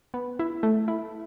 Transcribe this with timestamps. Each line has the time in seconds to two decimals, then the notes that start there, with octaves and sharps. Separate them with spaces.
0.14 B3
0.39 E4
0.63 A3
0.88 E4